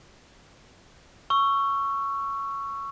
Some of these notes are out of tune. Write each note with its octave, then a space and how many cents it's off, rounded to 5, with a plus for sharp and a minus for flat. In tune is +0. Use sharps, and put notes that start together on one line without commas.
C#6 +0 E6 +25